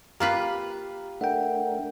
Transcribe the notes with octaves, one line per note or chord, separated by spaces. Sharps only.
A#3 F4 G4 B4 A#5
A3 D4 A#4 E5 F#5 G5